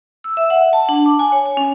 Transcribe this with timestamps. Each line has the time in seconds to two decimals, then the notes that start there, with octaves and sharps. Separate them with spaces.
0.24 E6
0.37 E5
0.50 F#5
0.73 A5
0.89 D4
1.06 D6
1.19 G#5
1.32 C#5
1.46 G#5
1.57 C#4